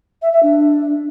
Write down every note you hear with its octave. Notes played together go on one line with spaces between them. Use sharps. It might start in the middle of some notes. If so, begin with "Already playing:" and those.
E5
E5
D4